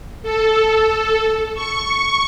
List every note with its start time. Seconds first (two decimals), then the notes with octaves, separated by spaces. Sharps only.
0.23 A4
1.55 C#6